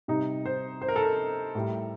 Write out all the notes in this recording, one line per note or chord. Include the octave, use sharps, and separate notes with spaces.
C3 G3 D#4
C5
C5
A#4
A4
A#4
A2 G3